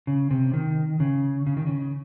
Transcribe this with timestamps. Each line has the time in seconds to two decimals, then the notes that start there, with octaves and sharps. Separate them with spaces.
0.07 C#3
0.31 C3
0.54 D#3
1.00 C#3
1.47 C#3
1.57 D#3
1.67 C#3